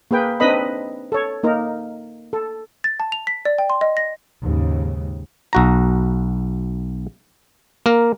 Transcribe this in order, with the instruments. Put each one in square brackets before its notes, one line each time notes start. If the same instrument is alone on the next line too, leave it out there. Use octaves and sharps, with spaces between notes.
[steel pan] A#3 G#4 B4 G5
C4 D4 D#4 B4 D#5 B5
A4 C#5
A#3 D#4 A#4
A4
[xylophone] A6
A5
F7
B6
D5
G5
C6
D#5
A#6
[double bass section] D#2 G#2 C#3
[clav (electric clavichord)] B1 F#4 A#5
A#3 A#4